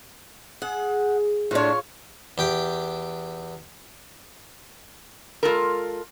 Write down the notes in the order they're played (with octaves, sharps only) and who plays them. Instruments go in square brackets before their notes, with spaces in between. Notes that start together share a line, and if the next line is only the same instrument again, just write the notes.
[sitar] G#4 [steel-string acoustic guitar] F#5
[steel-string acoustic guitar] A2 D4 [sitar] F4 B4 C#5
[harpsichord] E2 G4 G5
[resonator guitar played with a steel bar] G#3 F4 A4 A#4